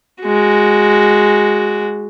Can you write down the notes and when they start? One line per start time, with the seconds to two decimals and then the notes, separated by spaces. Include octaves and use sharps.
0.23 G#3 F#4